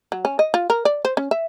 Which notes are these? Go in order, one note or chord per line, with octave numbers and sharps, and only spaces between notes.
F#3
C#4
D#5
F4
A#4
D5
C5
C#4
E5